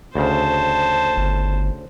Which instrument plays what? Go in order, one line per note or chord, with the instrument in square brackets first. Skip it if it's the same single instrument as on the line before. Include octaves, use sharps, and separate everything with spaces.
[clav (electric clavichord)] D2 C#3 [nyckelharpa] C5 A5
[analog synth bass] G1